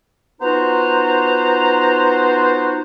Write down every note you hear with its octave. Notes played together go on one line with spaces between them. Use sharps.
B3 D#4 F4 F#4 C5 A#5